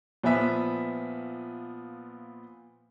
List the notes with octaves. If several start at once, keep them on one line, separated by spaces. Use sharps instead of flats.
A#2 F3 B3 B4 E5 B6